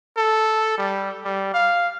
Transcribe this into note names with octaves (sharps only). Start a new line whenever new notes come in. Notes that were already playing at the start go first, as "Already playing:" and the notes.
A4
G3
G3
F5